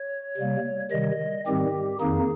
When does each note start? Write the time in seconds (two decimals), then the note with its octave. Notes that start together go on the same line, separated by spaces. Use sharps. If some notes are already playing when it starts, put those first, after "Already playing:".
Already playing: C#5
0.37 C3 G3 A#3
0.91 C3 D#3 G3 D#5
1.46 G#2 D#3 G3 C4 G4
2.00 F2 D#3 A#3 D#4 G#4